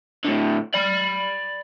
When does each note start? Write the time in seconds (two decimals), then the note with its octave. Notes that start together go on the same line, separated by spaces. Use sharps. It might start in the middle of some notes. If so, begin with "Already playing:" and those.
0.25 A2 D3
0.74 D5 B5